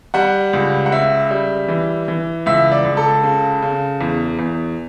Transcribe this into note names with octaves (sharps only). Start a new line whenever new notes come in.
G3 F#5
C#2
F#5
C#3 E5
G3
E3
E3
C#2 E5
D5
C#2
A4
C#3
C#3
E2
E2